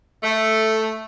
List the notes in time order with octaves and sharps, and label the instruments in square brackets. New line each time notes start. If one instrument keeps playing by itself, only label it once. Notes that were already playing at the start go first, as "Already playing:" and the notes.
[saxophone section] A3